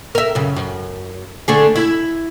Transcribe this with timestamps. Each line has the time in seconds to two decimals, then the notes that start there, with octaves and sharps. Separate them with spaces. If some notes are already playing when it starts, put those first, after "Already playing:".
0.15 A#4 E5
0.35 F#2 C#3
0.56 F#2
1.48 D3 A3 G#4
1.76 E4